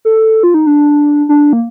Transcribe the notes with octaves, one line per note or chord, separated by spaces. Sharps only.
A4
F4
D#4
D4
D4
A#3